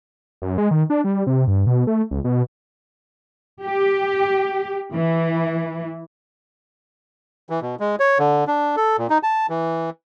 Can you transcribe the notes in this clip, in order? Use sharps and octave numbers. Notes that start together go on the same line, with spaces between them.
F#2
G#3
D#3
D4
G3
C3
G2
B2
A3
C#2
B2
G4
E3
E3
B2
G#3
C#5
D3
D4
A4
A#2
D#4
A5
E3